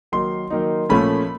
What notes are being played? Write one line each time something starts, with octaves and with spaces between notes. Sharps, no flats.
D#3 F#3 A#3 D#4 C6
D#3 F#3 A#3 D#4
A#2 F3 A3 C#4 B5